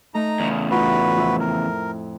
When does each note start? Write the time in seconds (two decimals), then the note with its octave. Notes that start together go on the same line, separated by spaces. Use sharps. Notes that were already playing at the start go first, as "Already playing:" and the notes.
0.14 A3 D#4 A#5
0.40 E2 C#3
0.71 A2 D#4 F4 F#4 B4
1.16 F2 E4
1.40 A#4